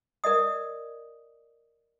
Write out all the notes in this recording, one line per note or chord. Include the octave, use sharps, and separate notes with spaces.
A#4 D5 D#5 D#6